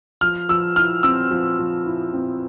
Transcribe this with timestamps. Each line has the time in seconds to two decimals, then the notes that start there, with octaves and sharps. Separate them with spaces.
0.21 F3 F6
0.49 F3 E6
0.76 E4 F6
1.03 C4 E6
1.31 F3
1.59 F3
1.86 E4
2.14 C4